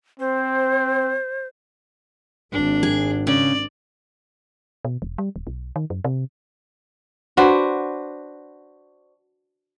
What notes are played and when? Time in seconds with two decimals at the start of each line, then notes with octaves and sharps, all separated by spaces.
0.20 C4 C5
2.52 G#1 D4
2.83 G#4
3.27 C#3 D5
4.85 B2
5.02 E1
5.18 G3
5.36 D#1
5.47 B1
5.76 D#3
5.90 F#2
6.04 C3
7.37 D4 F#4 B4 C5